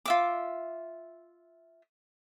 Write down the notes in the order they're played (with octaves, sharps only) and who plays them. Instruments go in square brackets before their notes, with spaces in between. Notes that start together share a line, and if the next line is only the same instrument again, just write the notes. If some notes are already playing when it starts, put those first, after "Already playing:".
[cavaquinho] F4 E5 D6